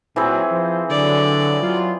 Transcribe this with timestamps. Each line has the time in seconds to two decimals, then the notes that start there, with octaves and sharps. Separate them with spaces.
0.16 A#2 E3 F#3 C4 G#4
0.51 F3 C5
0.90 D3 F#3 D5
1.61 F#3 F4